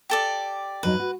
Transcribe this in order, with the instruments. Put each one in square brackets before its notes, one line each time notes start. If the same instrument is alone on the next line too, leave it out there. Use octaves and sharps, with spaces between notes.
[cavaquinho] G4 A4 D5
[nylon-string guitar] F2 F#3 D#4 [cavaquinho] B4
[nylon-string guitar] F#4